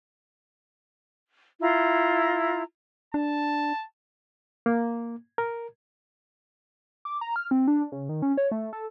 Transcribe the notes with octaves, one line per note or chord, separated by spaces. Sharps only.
E4 F4 A#5
D4 A5
A#3
A#4
D6
A#5
F6
C4
D4
C#3
D#3
C#4
C#5
A3
A4